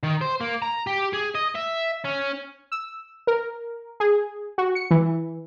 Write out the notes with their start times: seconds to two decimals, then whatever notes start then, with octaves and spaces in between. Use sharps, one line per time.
0.04 D#3
0.21 C5
0.41 A#3
0.62 A#5
0.87 G4
1.13 G#4
1.35 D#5
1.55 E5
2.04 C#4
2.72 E6
3.27 A#4
4.00 G#4
4.58 F#4
4.75 C#7
4.91 E3